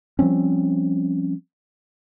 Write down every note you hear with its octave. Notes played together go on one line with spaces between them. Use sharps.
F3 G3 C4 C#4